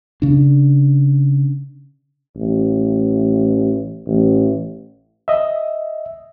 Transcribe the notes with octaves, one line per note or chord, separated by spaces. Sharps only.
C#3 D4
A1
A1
D#5 E5